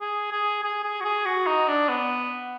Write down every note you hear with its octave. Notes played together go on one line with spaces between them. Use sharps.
G#4
G#4
G#4
G#4
F#4
G#4
F#4
D#4
D4
B3